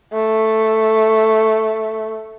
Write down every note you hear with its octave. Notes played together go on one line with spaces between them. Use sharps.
A3